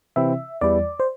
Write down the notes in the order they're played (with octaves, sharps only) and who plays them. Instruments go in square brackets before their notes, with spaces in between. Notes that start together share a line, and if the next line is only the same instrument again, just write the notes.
[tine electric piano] C3 E3 C4 E4 [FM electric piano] E5
[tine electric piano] E2 E3 G3 E4 [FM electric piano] D5
[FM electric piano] C5